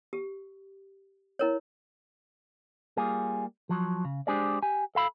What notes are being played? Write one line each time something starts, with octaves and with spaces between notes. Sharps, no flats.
G4
E4 A#4 C#5
G3 A#3 F4 G#4
F3 F#3
C#3
G#3 D4 G4 G#4 C5 D5
G4 G#5
A4 F5 B5